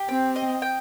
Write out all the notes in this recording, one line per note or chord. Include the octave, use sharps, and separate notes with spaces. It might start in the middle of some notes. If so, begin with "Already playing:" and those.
Already playing: G4
C4 G5
D#5
G5